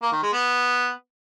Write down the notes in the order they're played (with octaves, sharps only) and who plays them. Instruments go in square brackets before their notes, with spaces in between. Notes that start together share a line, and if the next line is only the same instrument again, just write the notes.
[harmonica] A#3
D#3
G#3
B3